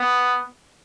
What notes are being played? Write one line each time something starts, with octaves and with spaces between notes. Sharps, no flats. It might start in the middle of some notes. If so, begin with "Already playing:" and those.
Already playing: B3